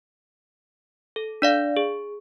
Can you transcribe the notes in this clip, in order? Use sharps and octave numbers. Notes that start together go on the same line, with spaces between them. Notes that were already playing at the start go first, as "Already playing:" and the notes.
A4
D4 D5 F5
G#4